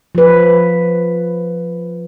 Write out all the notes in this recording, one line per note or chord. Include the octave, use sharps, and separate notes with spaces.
F3 B4